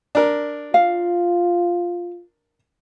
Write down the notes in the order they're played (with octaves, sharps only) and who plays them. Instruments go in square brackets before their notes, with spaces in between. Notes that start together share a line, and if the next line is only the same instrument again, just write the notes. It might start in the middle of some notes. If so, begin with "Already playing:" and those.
[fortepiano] D4 A#4
[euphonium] F4 [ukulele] F5